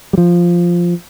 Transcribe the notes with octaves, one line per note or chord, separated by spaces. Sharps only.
G3
F3